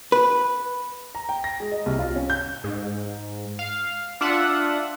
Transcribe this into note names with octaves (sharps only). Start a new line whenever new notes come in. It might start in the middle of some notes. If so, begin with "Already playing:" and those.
B4
A#5
G5
A#6
G#3
D#5
C2
F4
C#4
G6
G#2
F5
D4 F4 E5 F#5